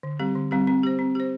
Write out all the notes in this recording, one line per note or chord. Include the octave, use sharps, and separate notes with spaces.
D3
G3 C4 G4
D3
G3 C4 G4
C4
G4 C5
C4
G4 C5